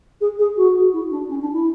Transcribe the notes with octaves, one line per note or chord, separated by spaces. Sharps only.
G#4
G#4
F#4
E4
D4
C#4
D4
E4